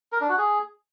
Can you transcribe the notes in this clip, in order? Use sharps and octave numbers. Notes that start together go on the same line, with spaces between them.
A#4
D4
F#4
G#4